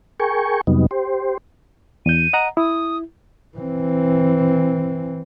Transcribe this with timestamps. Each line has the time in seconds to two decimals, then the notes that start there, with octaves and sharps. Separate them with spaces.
0.20 G#4 A#4 G5 G#5 C#6
0.67 F2 C3 F#3 G3 B3 D#4
0.91 G4 C5
2.06 E2 G6 D#7
2.33 D#5 F#5 A#5
2.57 E4 D#6
3.57 E3 C4